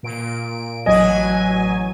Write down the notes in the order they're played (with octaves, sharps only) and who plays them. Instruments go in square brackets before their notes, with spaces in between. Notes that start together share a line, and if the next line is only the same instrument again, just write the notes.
[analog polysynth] A#2 D7
[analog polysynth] A1 F#3 G#5 [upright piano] D#5